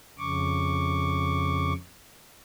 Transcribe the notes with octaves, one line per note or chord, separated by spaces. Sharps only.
F2 C#3 C#6 D6